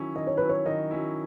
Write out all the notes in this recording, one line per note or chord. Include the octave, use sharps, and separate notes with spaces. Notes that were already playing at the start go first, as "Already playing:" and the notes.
Already playing: D#3 F#3 C#4 E4
D#3 D#5
C#5
F#3 C#4 E4 B4
C#5
D#3 D#5
F#3 C#4 E4